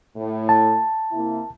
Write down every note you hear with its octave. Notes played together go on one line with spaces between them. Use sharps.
A2
A5
C3 A#3 E4